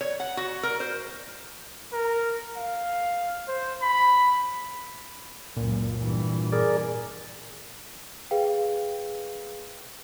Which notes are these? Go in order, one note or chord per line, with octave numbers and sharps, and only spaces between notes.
C#5
F#5
F#4
A#4
C5
A#4
F5
C5
B5
C#2 F#2 A#2
G2 E3
G#4 A#4 D5
G#4 B4 F5 G5